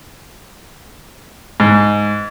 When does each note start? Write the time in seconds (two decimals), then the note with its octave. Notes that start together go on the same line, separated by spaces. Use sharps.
1.60 G#2